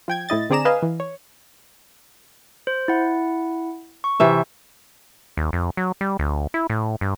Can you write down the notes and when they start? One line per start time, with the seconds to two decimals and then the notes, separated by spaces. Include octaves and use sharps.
0.08 F3 G5 G#6
0.29 A2 E4 D#5 A6
0.50 D3 C4 G#4 D5 A#5 E7
0.65 B4 D#5 F5 G#5
0.82 E3
1.00 C#5
2.67 C5
2.88 E4 F#5
4.04 C#6
4.20 C3 E3 E5
5.37 D#2
5.53 F2
5.77 F#3
6.01 G3
6.19 D2
6.54 E4
6.70 A2
7.01 G2